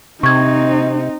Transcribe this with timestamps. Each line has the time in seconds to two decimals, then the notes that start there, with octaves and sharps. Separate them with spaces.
0.23 C3 C4 D#4 C#6 G#6